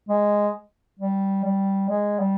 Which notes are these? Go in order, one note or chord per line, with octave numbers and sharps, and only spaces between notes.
G#3
G3
G3
G#3
G3